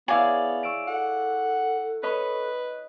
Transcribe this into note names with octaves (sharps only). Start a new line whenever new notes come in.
B3 E4 G#4 C#5 D5 F5
C#6 E6 D7
A4 F#5
B4 C#5 D#5 B5